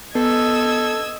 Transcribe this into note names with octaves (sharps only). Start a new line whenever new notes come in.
B3 A4 D#5 E6 G#6